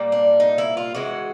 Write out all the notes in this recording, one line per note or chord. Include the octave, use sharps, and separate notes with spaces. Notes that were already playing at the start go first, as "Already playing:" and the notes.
Already playing: A#2 G3 A#3
D4
D#4
E4
F4
C#3 E3 G#3 F#4